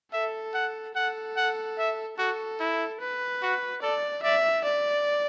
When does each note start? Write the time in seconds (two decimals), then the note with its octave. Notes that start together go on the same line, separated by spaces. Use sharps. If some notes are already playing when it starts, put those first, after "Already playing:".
0.13 A4 E5
0.54 F#5
0.96 A4 F#5
1.37 F#5
1.78 E5
2.18 F#4 A4
2.60 E4
3.01 B4
3.42 F#4
3.82 A4 D5
4.23 D5 E5
4.65 D5